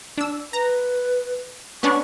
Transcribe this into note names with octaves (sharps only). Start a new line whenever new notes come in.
D4 E6
B4 A#5
B3 C#4 D4 C#6